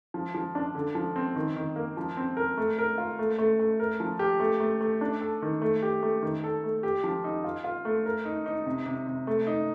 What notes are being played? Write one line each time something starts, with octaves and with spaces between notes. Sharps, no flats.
F3
F3
D4
D3
F3
C4
D#3
D#3
A#3
F3
C4
A#4
A3
A#4
F4
A3
A3
A3
A#4
F3
G4
A3
A3
A3
D4
A4
D#3
A3
G4
A3
D#3
A4
A3
G4
F3
D#4
F4
F4
A3
A#4
D#4
D#4
C3
C3
C3
A3
D#4